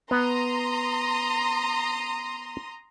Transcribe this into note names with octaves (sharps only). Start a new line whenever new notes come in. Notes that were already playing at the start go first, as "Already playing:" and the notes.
B3 A#5 C6 D#6